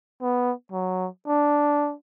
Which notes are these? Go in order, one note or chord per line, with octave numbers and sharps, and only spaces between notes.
B3
F#3
D4